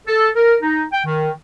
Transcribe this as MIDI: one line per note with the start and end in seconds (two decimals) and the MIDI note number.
0.08 0.30 69
0.36 0.56 70
0.62 0.83 63
0.93 1.03 79
1.05 1.31 51